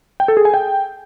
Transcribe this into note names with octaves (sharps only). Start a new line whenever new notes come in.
G5
A4
G#4
G#5
G5